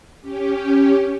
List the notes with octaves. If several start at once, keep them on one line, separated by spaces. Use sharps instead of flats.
C#4 G4